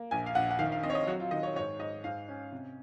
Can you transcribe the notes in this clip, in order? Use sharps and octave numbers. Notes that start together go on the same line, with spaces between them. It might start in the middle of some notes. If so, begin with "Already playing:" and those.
Already playing: A#3
A#1 G#5
F5
A#1 F#5
F#5
D#3 F5
F5
C4 D#5
C#5
D#5
F#3 F#4
F4
D#3 D#5
C#5
G#2 C#5
G#2 D#5
G#2 F5
C#4
C3